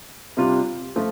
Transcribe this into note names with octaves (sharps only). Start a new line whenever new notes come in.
C3 G3 D4 F4
F3 A3 F4